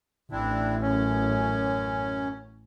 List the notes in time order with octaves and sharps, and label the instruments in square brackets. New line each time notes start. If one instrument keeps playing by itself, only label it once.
[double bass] A1 [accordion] C4 D4 E4
[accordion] F#2 C#4